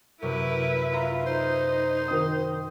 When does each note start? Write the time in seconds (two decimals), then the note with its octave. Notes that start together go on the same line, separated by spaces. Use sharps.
0.22 F#2 C3 E4 A#4 B4
0.92 F4 E5 A#5
1.26 D#4 C5
2.08 D#3 D#6